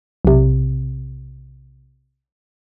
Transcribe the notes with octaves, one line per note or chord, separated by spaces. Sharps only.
B1 C3